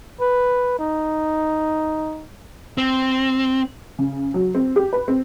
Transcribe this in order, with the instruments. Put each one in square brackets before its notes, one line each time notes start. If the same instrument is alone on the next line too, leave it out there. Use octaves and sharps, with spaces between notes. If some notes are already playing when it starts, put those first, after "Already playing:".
[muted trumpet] B4
D#4
[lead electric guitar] C4
[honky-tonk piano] C#3
F#3
C4
G4
B4
C4